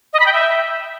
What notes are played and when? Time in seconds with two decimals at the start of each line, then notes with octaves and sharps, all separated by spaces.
0.13 D#5
0.20 B5
0.26 G5
0.33 E5